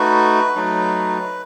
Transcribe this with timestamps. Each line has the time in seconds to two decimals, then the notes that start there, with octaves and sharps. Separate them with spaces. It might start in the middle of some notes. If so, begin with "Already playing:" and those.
Already playing: A3 D#4 F#4 B4
0.55 F#3 A3 D#4